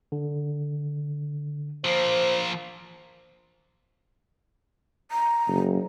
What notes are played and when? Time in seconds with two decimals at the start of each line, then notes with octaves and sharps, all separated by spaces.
0.12 D3
1.85 F3 A#3 C5
5.11 A#5
5.47 F#1